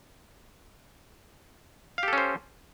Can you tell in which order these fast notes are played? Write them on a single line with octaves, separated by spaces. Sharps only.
F5 G4 A4 C#4 C5